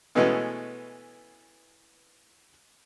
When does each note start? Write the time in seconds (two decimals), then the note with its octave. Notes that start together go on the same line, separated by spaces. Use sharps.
0.15 B2 E3 G#3 A3 B3 C#4